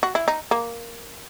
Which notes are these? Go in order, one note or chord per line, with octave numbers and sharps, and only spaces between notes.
F#4
E4
D#4
A#3